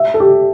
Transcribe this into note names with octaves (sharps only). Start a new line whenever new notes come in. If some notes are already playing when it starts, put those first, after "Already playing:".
Already playing: E5
A4
G4